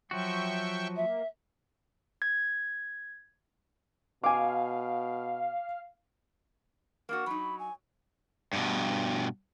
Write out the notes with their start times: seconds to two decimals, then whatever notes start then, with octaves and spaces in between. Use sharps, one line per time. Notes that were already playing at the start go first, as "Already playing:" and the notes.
0.11 F3 F#3 F#4 E5 G5 C#6
0.95 A#3 E5
2.22 G#6
4.24 B2 F5 G#5 D6
7.09 A#3 D4 F#4
7.26 F#3 D#4 B5
7.59 G#5
8.53 G2 B2